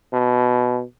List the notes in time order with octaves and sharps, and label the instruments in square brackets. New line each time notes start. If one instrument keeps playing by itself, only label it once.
[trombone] B2